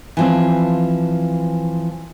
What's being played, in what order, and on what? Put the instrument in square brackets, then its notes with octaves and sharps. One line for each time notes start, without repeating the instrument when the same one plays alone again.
[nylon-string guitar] E3 F3 C4